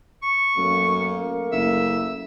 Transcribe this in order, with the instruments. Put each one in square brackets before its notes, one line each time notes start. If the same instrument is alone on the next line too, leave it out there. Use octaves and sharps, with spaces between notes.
[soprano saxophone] C#6
[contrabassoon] F#2 [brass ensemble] A3 A#3
[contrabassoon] F#1 [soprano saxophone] E5